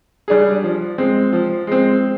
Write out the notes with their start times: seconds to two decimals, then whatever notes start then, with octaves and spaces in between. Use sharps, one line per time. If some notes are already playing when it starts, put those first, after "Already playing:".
0.28 G3 D4 G#4
0.63 F3
0.98 G#3 C4
1.33 F3
1.67 G#3 C4